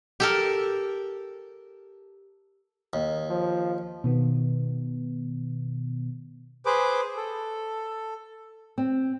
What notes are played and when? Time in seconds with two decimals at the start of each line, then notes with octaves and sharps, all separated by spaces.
0.20 G4 A4 A#4
2.93 D#2
3.30 F3
4.04 B2 D#3 B3
6.66 G#4 B4 C5 D6
7.17 A4
8.78 C4